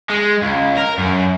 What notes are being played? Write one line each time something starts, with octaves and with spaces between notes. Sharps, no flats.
G#3
C#2
A#4
F#2